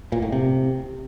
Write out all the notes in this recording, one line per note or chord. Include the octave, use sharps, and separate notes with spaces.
A#2
A2
C3